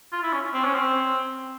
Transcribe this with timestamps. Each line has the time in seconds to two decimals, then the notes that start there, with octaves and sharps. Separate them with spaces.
0.13 F4
0.23 E4
0.33 C#4
0.54 C4
0.64 C#4
0.75 C4